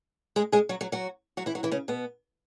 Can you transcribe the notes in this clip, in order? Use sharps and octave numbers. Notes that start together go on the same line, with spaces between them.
G#3 G#4
G#3 G#4
F#3 F#4
F#3 F#4
F#3 F#4
F#3 F#4
E3 E4
F#3 F#4
E3 E4
C#3 C#4
B2 B3